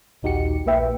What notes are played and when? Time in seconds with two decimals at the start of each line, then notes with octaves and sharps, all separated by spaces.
0.22 A#1 D#2 D#4 F#4 G4 C#7
0.66 A#1 A#3 B4 E5 G5